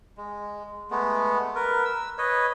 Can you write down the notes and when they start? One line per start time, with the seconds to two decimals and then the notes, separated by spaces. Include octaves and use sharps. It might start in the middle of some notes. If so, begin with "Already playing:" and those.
0.17 G#3
0.91 G#3 A3 B3
1.55 A#4 B4
1.85 E6
2.18 B4 C#5 D#5